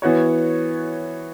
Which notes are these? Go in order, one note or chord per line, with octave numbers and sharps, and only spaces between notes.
E3 B3 F#4 C#5